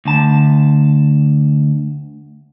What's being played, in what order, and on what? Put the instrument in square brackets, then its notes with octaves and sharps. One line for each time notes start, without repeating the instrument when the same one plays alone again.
[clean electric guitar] D2 A5